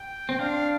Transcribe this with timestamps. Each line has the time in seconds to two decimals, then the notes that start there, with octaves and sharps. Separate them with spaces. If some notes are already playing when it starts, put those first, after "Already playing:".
Already playing: G5
0.29 C4
0.39 D4 F5